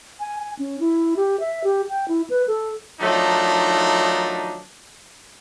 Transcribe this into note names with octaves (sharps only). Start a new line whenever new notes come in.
G#5
G#5
C#4
E4
G4
E5
G4
G5
E4
B4
A4
D#3 F3 F#3 A3 D4 D#4